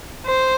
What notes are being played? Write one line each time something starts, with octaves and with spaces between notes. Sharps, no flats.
C5